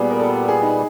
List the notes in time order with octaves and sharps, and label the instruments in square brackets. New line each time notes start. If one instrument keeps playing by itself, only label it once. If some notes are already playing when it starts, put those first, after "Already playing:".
Already playing: [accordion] A#2 G3 B3 [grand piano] G#4
[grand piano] A#4
A4
G#4
D#4